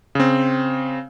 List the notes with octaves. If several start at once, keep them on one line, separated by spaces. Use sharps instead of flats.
C#3 C4